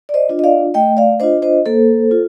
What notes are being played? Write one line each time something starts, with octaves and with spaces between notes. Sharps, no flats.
D5
C5 D#5
D4 F4
D#5
D5 F5
A3 D#5 G5
D5 F5
D4 F4 C5 D#5
C5 D#5
A#3 A4 C5
F4